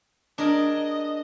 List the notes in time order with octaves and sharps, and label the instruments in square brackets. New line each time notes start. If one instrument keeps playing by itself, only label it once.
[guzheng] D4 G#4 A#4 [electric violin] D#5